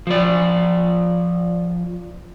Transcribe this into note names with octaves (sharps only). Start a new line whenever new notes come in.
F3 D5